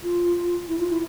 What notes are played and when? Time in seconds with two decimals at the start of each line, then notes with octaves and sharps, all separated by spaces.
0.03 F4
0.68 E4
0.79 F4
0.90 E4